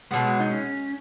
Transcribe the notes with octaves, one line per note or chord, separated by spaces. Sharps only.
B2 F#3 G#3 B3
D#4
C#4